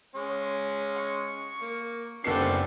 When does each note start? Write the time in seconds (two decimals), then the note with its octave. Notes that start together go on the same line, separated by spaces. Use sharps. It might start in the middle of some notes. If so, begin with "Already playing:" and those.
0.15 G#3 C#4
0.96 C#6
1.62 A#3
2.24 F#1 G3 B3 C4 D4 A4 C7